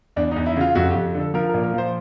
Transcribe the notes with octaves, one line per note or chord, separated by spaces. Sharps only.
E2 D4
E2 D#4
E4
C#3 F4
F2 F#4
G4
F2
D3 A4
F3 A#4
A#4
A#2
A#4
F3
C5